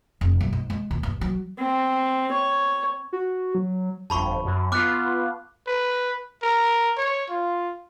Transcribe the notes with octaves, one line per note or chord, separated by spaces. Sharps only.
F1
F#2
G#2
G#3
D#2
G2
F#3
C4
C#5
F#4
F#3
G1 F2 A5 B5 C#6
F#2
B3 F4 D6 F6 F#6
B4
A#4
C#5
F4